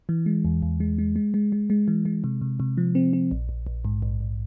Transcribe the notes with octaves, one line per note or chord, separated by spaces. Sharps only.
E3
G#3
E2
E2
G#3
G#3
G#3
G#3
G#3
G#3
E3
G#3
C3
C3
C3
F3
C4
C4
A#1
A#1
A#1
G#2
A#1
A#1